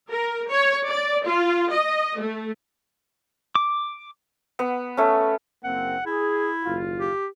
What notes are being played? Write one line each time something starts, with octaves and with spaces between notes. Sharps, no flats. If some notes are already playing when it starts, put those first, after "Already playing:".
A#4
C#5
D5
F4
D#5
A3
D6
B3
A3 C#4
F#1 A#3 C4 F#5
E4 G#4
F#1 D#2 F4
G4